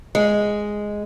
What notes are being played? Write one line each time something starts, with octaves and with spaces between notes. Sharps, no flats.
G#3